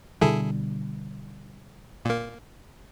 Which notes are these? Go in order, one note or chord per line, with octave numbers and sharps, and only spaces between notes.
B2 D3 G3 E4 G#4 A4
A#2 A#3